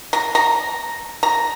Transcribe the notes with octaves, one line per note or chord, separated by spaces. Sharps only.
A#5
A#5
A#5